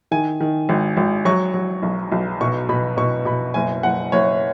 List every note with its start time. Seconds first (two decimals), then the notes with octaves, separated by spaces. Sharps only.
0.11 D#3 G#5
0.40 D#3
0.69 G#1
0.97 G#1
1.25 F#3 C#6
1.54 F#3
1.83 B1
2.12 B1
2.41 B2 C#6
2.69 B2 B5
2.97 B2 C#6
3.26 B2 B5
3.54 F#1 G#5
3.83 F#1 F#5
4.12 F#1 C#5